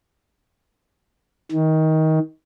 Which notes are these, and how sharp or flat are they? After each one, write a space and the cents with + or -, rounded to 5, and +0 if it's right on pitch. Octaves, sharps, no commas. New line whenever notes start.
D#3 +20